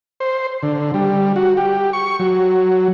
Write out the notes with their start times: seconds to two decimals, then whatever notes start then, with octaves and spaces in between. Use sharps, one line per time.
0.20 C5
0.63 D3
0.94 G3
1.36 F#4
1.57 G4
1.93 C#6
2.19 F#3